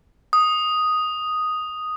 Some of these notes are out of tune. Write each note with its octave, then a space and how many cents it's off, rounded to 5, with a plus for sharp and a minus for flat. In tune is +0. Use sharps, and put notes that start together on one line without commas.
D#6 +0